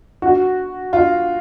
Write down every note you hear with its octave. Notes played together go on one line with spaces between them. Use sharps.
F#4
F4